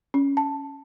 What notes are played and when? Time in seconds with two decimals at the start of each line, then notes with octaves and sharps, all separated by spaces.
0.14 C#4
0.37 A5